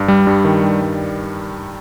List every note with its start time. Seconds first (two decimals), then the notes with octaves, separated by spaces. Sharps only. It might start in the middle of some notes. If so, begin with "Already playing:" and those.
Already playing: G2
0.08 G3
0.27 G2
0.45 D#3
0.63 G2
0.82 G3